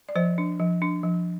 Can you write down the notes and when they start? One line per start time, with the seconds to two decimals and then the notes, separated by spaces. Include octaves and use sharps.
0.09 D5
0.16 F3 C5
0.38 D4
0.59 F3
0.82 D4
1.03 F3